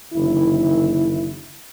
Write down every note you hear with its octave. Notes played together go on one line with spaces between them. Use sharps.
F#1 D3 D#3 E4